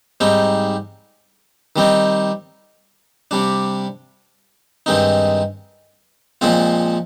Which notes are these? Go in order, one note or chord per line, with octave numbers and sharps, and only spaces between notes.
G#2 G3 C4 D#4
D#3 G3 C4 D#4
C3 G3 D4
G2 D#3 G#3 C4 D#4
A#2 F3 G#3 C4 F4